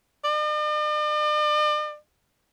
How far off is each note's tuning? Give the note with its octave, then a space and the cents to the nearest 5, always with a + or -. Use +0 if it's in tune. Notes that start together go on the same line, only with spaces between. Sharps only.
D5 +45